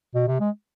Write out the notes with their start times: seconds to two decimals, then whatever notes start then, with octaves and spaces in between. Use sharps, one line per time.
0.15 B2
0.28 C3
0.41 G#3